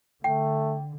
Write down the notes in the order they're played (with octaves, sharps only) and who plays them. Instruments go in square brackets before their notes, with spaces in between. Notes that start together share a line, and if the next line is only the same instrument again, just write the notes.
[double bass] D3 [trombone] A3 [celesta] G5